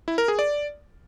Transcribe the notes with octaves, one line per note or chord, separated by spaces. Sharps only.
E4
A#4
G#4
D5